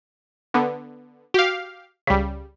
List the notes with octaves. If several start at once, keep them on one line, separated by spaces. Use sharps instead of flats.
D3 B3
F#4 G4 F5
C#2 C#3 G3 B6